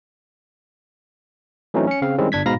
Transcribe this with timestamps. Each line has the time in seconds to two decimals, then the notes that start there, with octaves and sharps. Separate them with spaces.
1.74 E3 F#3 A3 C4 C#4 D#4
1.87 C#4 C#7
2.02 C#3 C4 F5
2.18 D#3 G3 G#3 C4 C#4 E4
2.32 G1 D4 G#6 B6
2.46 G#2 B2 F5 A#5 B5 A#6